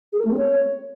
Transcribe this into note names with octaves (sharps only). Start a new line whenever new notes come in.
G#4
A#4
A3
C4
C#5